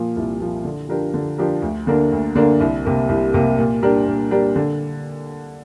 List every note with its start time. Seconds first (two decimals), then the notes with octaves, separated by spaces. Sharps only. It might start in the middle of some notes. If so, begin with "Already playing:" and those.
Already playing: A#2 F3
0.16 C2
0.40 A#2 F3
0.65 D3
0.89 F3 D4 G4 A#4
1.14 D3
1.38 F3 D4 G4 A#4
1.62 D2
1.87 D3 A#3 D4 A#4
2.12 D2
2.35 D3 A#3 D4 A#4
2.60 C2
2.85 C3 A#3
3.09 C2
3.34 C3 A#3
3.58 A#2
3.83 G3 D4 G4 A#4
4.07 A#2
4.31 G3 D4 G4 A#4
4.56 D3